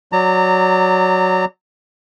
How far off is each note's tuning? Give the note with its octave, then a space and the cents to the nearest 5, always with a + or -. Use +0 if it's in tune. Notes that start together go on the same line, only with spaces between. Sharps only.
F#3 +0 D5 +0 A#5 -30